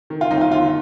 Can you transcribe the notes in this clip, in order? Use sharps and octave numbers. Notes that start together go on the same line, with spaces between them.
D#3
F4
G1 D#4
F4
G1 F4